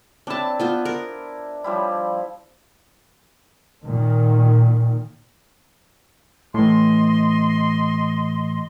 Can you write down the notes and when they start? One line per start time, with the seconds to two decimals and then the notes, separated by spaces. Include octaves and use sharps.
0.27 C4 D4 E4 A5
0.60 B3 F4 C5
0.85 A#4
1.64 F3 G3 E4
3.85 A#2 D#3
6.54 A2 E3 D#5 C6